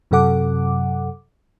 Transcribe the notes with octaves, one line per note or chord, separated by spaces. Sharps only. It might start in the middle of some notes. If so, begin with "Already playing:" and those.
F#2 C3 F#3 A4 F#5 D6